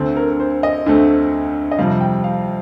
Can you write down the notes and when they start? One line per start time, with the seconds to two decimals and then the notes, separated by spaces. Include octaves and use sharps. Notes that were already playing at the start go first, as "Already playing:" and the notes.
Already playing: D2 D3 A3 C4
0.16 A#4
0.40 C5
0.63 D#5
0.86 D2 D3 A3 C4
1.71 D#5
1.79 F2 C3 G3 F5
2.01 G5
2.24 F5